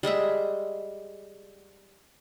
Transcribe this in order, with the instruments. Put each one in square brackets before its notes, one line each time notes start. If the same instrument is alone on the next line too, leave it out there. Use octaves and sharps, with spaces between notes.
[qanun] G3 G#3 D#5 E5